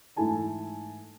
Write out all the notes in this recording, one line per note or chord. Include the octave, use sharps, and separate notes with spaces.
G#2 E3 A3 E4 G#5 A5